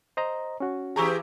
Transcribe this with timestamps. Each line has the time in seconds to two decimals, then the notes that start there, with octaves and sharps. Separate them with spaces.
0.17 C5 D#5 A#5
0.60 C#4 F#4
0.96 E3 G4 G#4 A#5 C#6 E6